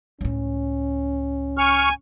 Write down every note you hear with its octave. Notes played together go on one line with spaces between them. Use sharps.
C#2 A2 C#4
G#5 C#6 F6